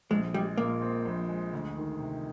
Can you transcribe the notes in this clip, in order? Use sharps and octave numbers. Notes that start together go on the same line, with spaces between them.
A#1 G#3
G3 G#3
A#2 A#3
C4
A#1
G#3
D2
D#3
C3